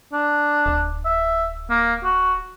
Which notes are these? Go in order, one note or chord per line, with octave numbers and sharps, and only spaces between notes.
D4
D1
E5
A#3
F#4